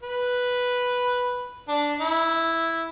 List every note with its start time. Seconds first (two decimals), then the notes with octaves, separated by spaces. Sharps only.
0.03 B4
1.68 D4
2.01 E4